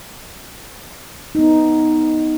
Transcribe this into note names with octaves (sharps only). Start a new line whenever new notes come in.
B3 D#4